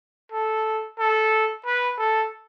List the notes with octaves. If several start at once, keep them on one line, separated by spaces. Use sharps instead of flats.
A4
A4
B4
A4